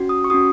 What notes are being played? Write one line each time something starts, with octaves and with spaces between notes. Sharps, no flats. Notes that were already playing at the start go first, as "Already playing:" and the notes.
Already playing: C#4 F#4
D#6
C#6
C#4 F#4 D#6